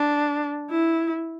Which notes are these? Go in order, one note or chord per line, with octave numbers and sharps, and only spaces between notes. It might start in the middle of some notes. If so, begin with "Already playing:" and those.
Already playing: D4
E4